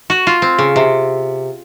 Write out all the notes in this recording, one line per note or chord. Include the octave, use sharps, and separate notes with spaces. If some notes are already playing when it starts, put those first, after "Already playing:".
F#4
F4
C4
C#3
C3